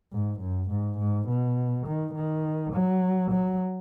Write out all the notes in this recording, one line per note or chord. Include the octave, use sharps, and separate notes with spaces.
G#2
F#2
G#2
G#2
B2
D#3
D#3
F#3
F#3